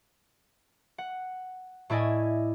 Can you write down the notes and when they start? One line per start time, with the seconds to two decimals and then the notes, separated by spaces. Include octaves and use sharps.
0.98 F#5
1.90 A2 E4 D5 D#5 G#5